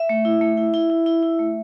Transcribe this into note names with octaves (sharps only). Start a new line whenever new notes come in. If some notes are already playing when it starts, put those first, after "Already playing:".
Already playing: E5
A3
E4
A3
E4
E4
E4
E4
E4
A3